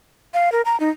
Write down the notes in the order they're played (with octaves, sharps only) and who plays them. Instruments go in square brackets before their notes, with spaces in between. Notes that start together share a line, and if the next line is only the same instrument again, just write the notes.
[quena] F5
A#4
A#5
D#4